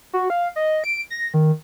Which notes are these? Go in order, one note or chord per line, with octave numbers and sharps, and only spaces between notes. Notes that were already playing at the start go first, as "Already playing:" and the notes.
F#4
F5
D#5
D7
A#6
D#3